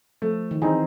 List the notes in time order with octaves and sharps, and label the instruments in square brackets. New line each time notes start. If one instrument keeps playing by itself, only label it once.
[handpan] F3 [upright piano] A3
[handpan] D#3
[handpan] E3 [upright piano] C4 D#4 G#4